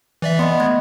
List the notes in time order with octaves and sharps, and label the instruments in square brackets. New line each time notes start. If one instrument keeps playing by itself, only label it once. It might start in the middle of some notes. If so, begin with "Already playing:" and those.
[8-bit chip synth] E3 D5 E5
[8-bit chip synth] B3 [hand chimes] D#5 B5 C6
[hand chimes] A3 G#6